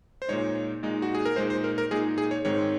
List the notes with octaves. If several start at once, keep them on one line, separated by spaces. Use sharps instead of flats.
C5
A#2 G#3 D#4 C#5
A#2 G#3 D#4
F#4
G#4
A#4
A#2 G#3 D#4 C5
C5
A#4
A#4
A#2 G#3 D#4 G#4
G#4
C#5
G#2 D#3 G#3 C4 C#5